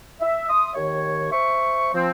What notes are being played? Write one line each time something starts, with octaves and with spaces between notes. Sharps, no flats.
E5
E5 C6 D#6
D#2 D#3 C#5
C5 E5 C#6
F3 C4